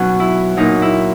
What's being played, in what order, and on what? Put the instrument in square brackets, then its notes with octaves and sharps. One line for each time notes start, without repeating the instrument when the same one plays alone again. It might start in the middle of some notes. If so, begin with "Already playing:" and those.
Already playing: [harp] B2 F#3 B3 C#4 D#4
E4
A#2 F#3 D#4
E4